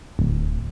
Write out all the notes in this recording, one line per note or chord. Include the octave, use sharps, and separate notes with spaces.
D1